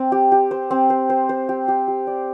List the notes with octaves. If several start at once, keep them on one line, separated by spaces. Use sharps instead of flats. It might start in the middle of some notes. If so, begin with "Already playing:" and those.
Already playing: C4
G4
G4
C5
C4
C5
C5
C5
G4
G4
G4
D5